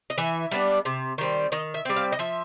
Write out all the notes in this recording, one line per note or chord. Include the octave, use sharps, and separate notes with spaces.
D#5
E3 E5
G3 B3 D4
C3
D#3 G3 C4
D#3 D#5
E5
G3 C4
F5
D#5
F3 E5